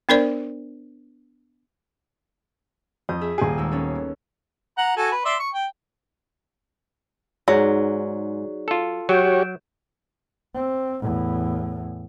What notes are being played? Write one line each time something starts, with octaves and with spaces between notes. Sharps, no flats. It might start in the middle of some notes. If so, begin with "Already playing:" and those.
B3 D4 A#4 C5 D5
F2 D#6 G6
G#4 E5
D#1 G#4 G5 D#7
D#2 G#3 E6
B3 C#4 A4
F#5 A#5
F#4 A4 G#5
B4
D5 E5 C6
C#6
G5
G#2 F#3 D#4 G#4 D5
F4 A4
F#3 F#4 G4 C#5 G6 D7 E7
C4
E2 A2